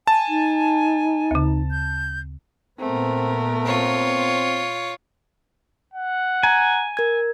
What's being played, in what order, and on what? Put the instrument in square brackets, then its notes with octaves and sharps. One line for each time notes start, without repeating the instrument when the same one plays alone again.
[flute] G#5 [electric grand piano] A5
[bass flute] D#4
[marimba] D2 C#3
[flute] G6
[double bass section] A#2 B3 [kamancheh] A3 A#4 [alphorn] C4
[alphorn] C4 [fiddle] F4 C#5
[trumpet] F#5
[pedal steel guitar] G#5 [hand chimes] A#5
[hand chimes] A#4 G#6